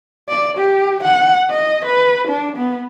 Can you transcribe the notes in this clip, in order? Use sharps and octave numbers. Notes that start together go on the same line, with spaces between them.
D5
G4
F#5
D#5
B4
D4
B3